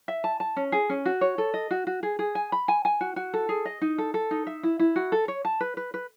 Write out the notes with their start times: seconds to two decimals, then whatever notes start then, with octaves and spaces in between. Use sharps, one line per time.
0.08 E5
0.24 A5
0.40 A5
0.56 C#4
0.72 G#4
0.90 C#4
1.05 F#4
1.21 C#5
1.38 A4
1.54 D#5
1.71 F#4
1.87 F#4
2.03 G#4
2.19 G#4
2.35 G#5
2.52 B5
2.68 G#5
2.85 G#5
3.01 F#4
3.16 F#4
3.34 A4
3.49 G#4
3.65 D#5
3.82 D#4
3.98 A4
4.14 A4
4.31 D#4
4.47 E5
4.63 E4
4.79 E4
4.96 F#4
5.12 A4
5.28 C#5
5.45 A5
5.61 B4
5.77 B4
5.94 B4